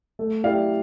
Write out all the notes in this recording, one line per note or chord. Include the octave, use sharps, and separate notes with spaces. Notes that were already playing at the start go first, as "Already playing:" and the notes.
A3
E4 G4 D5 F5